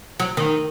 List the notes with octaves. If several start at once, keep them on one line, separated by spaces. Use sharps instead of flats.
F#3
D#3